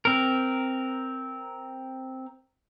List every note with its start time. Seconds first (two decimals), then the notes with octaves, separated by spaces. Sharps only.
0.05 C4 A#4